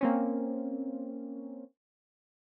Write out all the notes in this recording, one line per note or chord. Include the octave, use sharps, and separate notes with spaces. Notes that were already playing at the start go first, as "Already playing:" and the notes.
A#3 C4 C#4